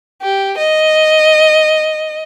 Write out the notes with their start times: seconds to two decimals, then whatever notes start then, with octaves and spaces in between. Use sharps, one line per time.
0.22 G4
0.58 D#5